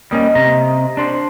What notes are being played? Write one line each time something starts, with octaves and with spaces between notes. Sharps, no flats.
G3 A#3 C#4 D#5
C3 A#5
D4 C5